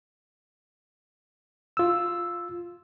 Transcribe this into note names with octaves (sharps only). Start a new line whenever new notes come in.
F4 E6